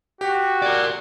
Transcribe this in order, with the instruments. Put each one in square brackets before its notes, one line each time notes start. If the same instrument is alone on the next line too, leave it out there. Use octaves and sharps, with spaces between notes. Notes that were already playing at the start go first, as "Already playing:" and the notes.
[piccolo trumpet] F#4 [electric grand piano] G4
[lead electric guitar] A#4 D5